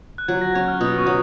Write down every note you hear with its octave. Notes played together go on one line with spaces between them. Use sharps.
F#6
F#3 G#6
A#6
C#4 G#6
F6
B2 D#6
C#6
F#3